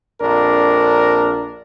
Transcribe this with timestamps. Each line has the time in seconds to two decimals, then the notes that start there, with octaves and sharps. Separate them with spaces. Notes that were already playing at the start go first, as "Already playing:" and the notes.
0.21 A#1 F2 D4 A#4